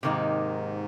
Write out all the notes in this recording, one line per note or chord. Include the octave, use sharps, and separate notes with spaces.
G#2 C3 D#3 A#3 D#4